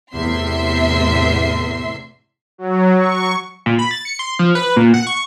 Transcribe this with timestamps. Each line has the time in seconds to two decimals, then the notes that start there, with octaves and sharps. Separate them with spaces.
0.14 E2 A2 C3 E5 C6
2.58 F#3
2.98 C#6
3.66 A#2
3.79 B5
3.91 A6
4.05 C#7
4.19 C6
4.39 F3
4.55 B4
4.76 A#2
4.94 F#5
5.07 C#6